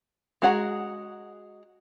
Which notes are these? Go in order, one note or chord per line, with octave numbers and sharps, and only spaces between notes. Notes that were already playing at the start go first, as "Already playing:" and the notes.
G#3 F#4 G#4 F#5 A#5